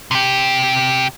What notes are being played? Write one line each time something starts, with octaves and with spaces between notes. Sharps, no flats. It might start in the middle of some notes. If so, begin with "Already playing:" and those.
C3 G4